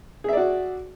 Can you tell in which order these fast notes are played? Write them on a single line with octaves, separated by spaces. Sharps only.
G#4 E5 D5 F#4